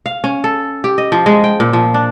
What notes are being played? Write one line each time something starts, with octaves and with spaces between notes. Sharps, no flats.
F5
C#4
A4
G4
D#5
F3
G#3
G5
A#2
F3
D4